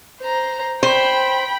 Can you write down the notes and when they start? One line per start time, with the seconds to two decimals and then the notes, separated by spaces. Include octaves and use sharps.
0.21 C5 A#5
0.83 C5 G5 B5